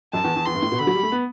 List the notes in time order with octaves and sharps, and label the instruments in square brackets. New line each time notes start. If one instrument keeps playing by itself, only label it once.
[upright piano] F#2 [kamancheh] A5
[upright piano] E2
E2
[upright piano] E2 [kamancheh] C6
[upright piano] G2
A2
B2
[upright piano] D3 [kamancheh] B5
[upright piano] F#3
G3
A3
B3